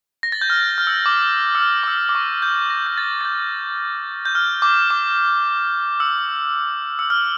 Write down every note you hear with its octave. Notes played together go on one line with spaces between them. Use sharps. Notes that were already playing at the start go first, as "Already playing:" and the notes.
A#6
A6
G6
F6
F6
E6
D6
E6
F6
D6
E6
D6
C#6
G6
A#6
G6
A6
A6
G6
G6
F6
D6
D6
E6
E6
F6